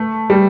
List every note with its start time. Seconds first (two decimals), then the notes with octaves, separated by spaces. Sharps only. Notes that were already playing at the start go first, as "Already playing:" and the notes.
Already playing: A3
0.30 G3